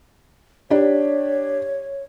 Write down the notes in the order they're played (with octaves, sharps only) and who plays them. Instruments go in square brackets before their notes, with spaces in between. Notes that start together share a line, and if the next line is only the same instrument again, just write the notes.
[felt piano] D4 G4 [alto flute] C#5